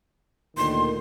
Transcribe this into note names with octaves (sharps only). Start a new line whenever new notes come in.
D2 A#2 D#3 C6